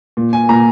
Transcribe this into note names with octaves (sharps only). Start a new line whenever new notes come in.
A#2
G#5
A#2 A#5